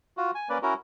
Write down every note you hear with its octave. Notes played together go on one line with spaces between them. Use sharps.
F4 F#4
G#5
A#3 C#4 B4 D5
C#4 E4 F#4 A#4